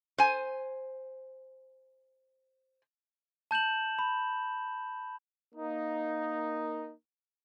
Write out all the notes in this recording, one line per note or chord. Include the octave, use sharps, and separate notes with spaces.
C5 G#5
A5 G6 E7 F#7
B5
A#3 D#4